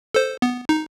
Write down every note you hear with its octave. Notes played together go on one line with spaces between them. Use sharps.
A4 C5
B3
D#4